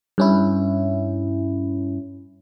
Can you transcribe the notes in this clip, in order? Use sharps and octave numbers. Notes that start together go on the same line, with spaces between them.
G2 C#4 E4